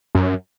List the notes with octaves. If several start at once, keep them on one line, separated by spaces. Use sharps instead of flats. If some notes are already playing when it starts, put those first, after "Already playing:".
F#2